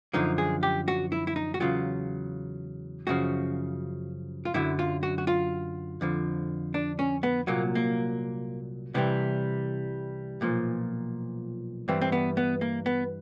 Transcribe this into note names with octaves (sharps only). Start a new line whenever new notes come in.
F#2 D3 F3 D#4
G#4
G4
F#4
E4
E4
D#4
F#4
E2 C#3 F#3 F4
F#2 C#3 F3 F#4
F4
F#2 D3 F#3 E4
F4
F#4
F#4
F4
F2 D3 F3
D4
C#4
B3
C2 A#2 F#3 A#3
A#3
C2 C3 E3 G3 B3
B1 A#2 F3
G2 E3 G3 C4
C4
B3
B3
A#3
B3